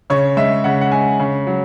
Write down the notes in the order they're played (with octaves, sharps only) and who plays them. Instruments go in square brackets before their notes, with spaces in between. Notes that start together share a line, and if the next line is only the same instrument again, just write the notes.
[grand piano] C#3 C#5
G#3 E5
C#3 F#5
F#5
G#3 G#5
C#3
F#3